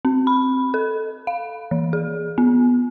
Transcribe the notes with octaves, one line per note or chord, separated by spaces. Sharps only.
C4
B5
A4
F5
E3
G#4
B3